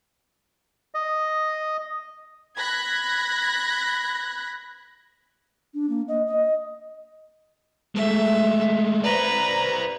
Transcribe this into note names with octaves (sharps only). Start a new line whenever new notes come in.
D#5
B5 F#6 G#6 A#6 B6
D4
A#3
D#5
D#5
G#3 A3 E5
B4 C5 D5 A#5